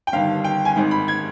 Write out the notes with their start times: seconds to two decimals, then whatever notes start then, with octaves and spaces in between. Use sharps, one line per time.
0.07 G5
0.12 G1 G2 D#3 F5
0.44 G5
0.65 G#5
0.76 G#1 G#2 D#3
0.91 B5
1.08 G#6